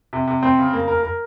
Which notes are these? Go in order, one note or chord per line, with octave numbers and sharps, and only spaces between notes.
C3
C3
C4
C#3
A#3
A#4
A#4